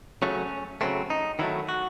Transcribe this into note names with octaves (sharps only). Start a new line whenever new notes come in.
C#3 F#3 A3 C#4
C#3 F#3 A3 C4
D#4
D#3 F#3 A3 E4
F#4